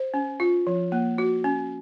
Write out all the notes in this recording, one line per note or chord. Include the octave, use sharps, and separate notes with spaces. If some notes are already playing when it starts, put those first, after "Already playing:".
Already playing: C5
C#4
F4
F3
A#3
F#4
C#4